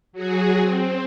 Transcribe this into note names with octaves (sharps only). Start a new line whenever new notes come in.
F#3 F#4 G#4
C4